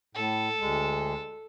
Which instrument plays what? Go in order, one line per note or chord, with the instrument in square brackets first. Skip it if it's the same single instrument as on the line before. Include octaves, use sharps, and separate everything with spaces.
[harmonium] A2 [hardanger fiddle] A4
[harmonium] D2 G#3